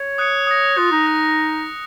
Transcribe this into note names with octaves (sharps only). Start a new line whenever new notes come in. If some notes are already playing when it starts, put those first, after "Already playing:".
Already playing: C#5
D#6 F#6 C#7
D#6 F#6 A#6
F4 D#6 F#6 A#6
D#4
D#6 F#6 A#6